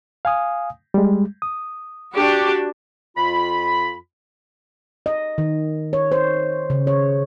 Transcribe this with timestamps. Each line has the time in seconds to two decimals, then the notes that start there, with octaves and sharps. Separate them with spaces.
0.25 F5 G#5 D#6
0.94 G3 G#3
1.42 D#6
2.15 D4 F#4 G4
3.17 F2 F4 B5
5.06 D#5
5.38 D#3
5.93 C#5
6.12 C5
6.70 C#3
6.87 C#5